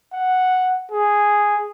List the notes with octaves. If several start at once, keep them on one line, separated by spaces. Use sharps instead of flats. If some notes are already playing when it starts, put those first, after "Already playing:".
F#5
G#4